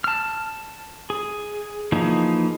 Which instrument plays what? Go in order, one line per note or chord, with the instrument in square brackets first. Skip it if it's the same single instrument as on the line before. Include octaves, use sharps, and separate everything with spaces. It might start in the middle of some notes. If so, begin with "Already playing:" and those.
[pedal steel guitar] A5 F6
G#4
E3 F3 A#3 D#4 G#4